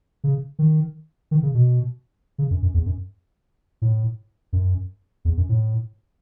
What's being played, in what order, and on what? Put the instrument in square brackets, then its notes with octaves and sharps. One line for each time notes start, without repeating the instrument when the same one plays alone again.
[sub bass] C#3
D#3
D#3
C#3
B2
C#3
F#2
F#2
E2
F#2
A2
F#2
E2
F#2
A2